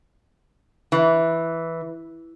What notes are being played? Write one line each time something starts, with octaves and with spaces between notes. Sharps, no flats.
E3